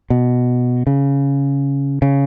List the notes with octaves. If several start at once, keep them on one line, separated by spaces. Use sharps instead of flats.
B2
C#3
C#3